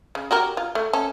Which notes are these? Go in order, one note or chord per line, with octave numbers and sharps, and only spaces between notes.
C#3
F#4 G4 A#4
F4
A3
C#4 A4